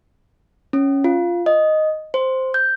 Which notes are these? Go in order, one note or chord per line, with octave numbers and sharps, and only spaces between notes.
C#4
F4
D#5
C5
G6